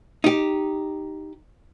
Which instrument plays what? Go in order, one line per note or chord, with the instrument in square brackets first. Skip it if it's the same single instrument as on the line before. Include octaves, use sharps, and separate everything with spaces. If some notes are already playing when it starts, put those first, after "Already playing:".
[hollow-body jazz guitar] D#4 G4